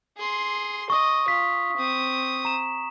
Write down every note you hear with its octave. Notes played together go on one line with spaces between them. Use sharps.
G#4 C6
D#5 C#6 D#6
F4 B6
C4 D#6
A#5 E7